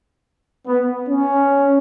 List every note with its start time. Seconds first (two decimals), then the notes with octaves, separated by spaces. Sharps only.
0.67 B3
1.09 C#4